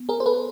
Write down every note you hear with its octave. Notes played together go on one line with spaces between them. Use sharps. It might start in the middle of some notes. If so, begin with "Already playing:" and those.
Already playing: B3
G#4 A#4
C5
A4 B4